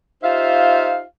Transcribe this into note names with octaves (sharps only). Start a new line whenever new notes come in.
D#4 F4 G4 C5 E5 F5